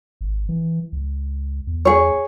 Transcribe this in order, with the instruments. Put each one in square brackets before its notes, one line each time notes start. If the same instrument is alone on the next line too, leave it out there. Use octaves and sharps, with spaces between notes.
[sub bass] G#1
E3
C#2
E2
[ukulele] G#4 C#5